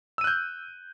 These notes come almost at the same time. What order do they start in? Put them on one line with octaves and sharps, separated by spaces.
E6 D#7 F#6 G6